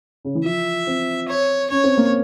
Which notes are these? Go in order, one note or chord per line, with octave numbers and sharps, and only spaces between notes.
C#3
E3
F3 E5
C4
C#5
C#4 C#5
C4
A#3